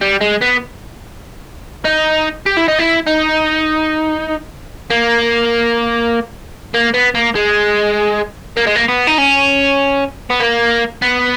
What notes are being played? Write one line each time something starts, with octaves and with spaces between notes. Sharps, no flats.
G3
G#3
B3
D#4
G4
E4
D#4
E4
D#4
A#3
A#3
B3
A#3
G#3
A#3
G#3
A#3
B3
D#4
C#4
B3
A#3
B3